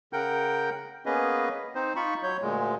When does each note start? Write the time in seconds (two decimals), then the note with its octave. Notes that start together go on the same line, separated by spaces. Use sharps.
0.13 C#3 A#4 F#5 G5 G6
1.06 A#3 B3 C#4 G#4 B4 D#5
1.75 C4 D#4 C5
1.96 D#4 F4 B5 C#6
2.23 F#3 C#5 G6
2.42 D2 A#2 G#3